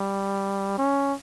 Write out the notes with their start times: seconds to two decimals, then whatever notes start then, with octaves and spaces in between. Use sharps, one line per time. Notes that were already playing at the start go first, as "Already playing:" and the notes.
Already playing: G3
0.78 C#4